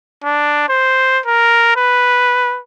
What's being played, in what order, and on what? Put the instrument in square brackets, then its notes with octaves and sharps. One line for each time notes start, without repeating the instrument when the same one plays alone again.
[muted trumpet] D4
C5
A#4
B4